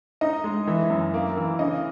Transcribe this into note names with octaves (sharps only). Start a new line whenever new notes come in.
D#4 D#5
G#3
E3 E5
F#2
A#3
E3
C#3 D#5